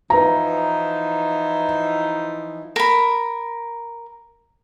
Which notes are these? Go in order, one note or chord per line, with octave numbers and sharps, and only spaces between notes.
E3 F3 D#4 B4 A#5
A#4 B5